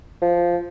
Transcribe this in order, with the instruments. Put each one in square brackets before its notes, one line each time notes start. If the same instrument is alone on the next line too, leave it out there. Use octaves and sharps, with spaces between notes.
[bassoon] F3